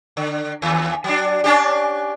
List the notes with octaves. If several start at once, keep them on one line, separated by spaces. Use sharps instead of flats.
D3
D#2
F#3 D4
C#4 D4 G4